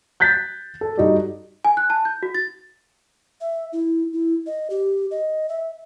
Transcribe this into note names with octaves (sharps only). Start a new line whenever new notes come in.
F#6 G6 A6 B6
A4
G2 D#4 F#4 A4 D5
G#5
F#6
A5
G6
F#4
A6
E5
E4
E4
D#5
G4
D#5
E5